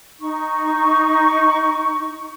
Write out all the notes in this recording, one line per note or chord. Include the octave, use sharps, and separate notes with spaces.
D#4 C#6